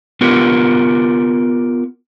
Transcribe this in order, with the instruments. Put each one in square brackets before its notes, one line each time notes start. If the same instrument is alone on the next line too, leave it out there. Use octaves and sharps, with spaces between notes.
[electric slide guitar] B3 F4 G4 A#4